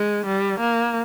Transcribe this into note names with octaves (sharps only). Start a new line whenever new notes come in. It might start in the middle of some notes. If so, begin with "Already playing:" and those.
Already playing: G#3
G3
A#3